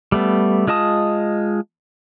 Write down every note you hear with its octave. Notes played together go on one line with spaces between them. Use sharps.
G3 A3 B3
G#3 F4 D#5 A5 D#6